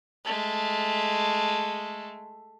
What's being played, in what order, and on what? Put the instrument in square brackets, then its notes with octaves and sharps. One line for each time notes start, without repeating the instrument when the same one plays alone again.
[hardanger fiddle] G#3 A3